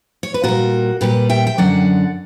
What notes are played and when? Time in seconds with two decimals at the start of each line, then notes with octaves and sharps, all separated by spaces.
0.23 C#5
0.34 B4
0.44 A#2 G3 F#4 A#4
1.01 A#2 G3 G4 B4
1.29 E5 G5
1.47 G5
1.58 F#2 D3 F#3 D5 F#5